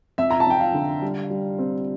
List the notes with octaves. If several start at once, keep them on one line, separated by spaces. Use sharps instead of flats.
F2 E5
A#5
A5
F2 G5
F5
D3
G3
G3
C4